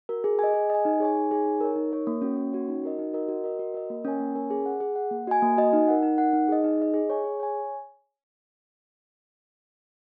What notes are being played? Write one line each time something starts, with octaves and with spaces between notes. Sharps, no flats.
F#4 A#4
G#4
D#5 G#5
G#4
D#5 G#5
D#4
G#4 C#5 G#5
D#4
G#4 C#5 G#5
D#4
A#4 C#5
D#4
A#4 C#5
A#3
C#4 F#4 C#5
A#3
C#4 F#4 C#5
D#4
F#4 A#4 D#5
D#4
F#4 A#4 D#5
F#4
A#4 D#5
F#4
A#4 D#5
A#3
C#4 A#4 C#5 G#5
A#3
C#4 A#4 C#5 G#5
G#4
F#5
G#4
F#5
A#3
F#4 D#5 G#5
A#3
F#4 D#5 G#5
D#4
A#4 F#5
D#4
A#4 F#5
D#4
G#4 D#5
D#4
G#4 D#5
G#4
C#5 G#5
G#4
C#5 G#5